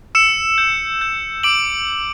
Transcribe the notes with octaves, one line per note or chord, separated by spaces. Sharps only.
E6 C#7 E7
G6
G6
D6 D7 F#7